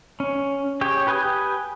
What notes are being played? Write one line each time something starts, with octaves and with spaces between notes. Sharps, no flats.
C#4
G4 G#4 C#5 G5
G4 B4 G5 G#5 D#6